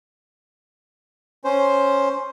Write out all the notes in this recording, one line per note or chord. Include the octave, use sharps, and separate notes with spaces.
C#4 C5